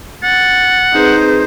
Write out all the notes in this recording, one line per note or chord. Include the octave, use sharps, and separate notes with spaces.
F#5 A6
C4 D#4 G#4 B4 C5